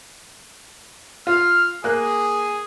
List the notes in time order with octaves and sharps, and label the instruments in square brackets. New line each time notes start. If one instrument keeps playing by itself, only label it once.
[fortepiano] F4 [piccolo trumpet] F6
[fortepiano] A#3 F#6 [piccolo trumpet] G#4